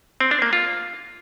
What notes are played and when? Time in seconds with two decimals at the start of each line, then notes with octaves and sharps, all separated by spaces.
0.21 C4
0.31 D4
0.42 A#3
0.53 F4